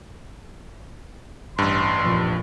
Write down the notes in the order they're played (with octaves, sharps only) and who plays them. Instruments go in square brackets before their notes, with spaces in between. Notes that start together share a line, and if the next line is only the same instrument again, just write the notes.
[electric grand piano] A1 G2 [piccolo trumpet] C6
[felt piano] F2 A#2